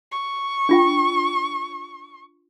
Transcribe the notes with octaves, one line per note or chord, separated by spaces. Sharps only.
C#6
D4 F4 G5